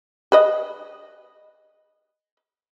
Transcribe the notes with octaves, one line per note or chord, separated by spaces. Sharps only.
G#4 B4 D#5